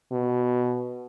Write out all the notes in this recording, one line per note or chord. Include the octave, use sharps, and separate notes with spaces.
B2